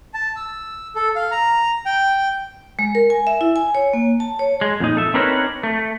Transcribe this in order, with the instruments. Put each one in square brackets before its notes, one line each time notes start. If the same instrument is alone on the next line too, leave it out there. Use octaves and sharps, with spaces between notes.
[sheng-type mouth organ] A5
E6
A4
F5
A#5
G5
[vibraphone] G#3
A#4
G#5
E5
E4
G#5
C#5
A#3
A5
C#5
[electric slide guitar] G#3
F2 A#2 D#4
A4 E5
C4 D4 D#4 A#4 B4 C#5
A3